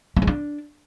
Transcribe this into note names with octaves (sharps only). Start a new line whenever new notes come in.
A3
G#3
D4